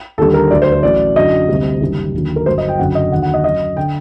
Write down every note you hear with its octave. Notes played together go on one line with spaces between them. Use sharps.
D#2 D3 G3 A4
A#4
D2 D3 F#3 D5
C5
C5
A1 A2 F#3 D5
F#2 D3 F#3 D#5
D2 C3 G3
F#1 F#2 D#3 G3
D#2 D3 F#3
A#4
G1 G2 F#3 C5
D#5
G5
F#1 F#2 D3 F#3 F#5
D#5
D#2 D3 F#3 F#5
F#5
D#5
F#2 F#3 D#5
D3 G5